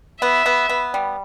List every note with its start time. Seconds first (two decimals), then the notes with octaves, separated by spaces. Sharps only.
0.22 B3 E5
0.46 B3
0.69 B3
0.94 G3